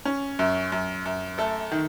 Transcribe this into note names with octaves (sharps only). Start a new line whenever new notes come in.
C#4
F#2
F#2
F#2
A3 A4
D#3